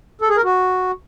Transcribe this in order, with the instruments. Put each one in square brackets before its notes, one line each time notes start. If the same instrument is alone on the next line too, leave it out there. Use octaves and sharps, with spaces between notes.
[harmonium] A4
G#4
A#4
F#4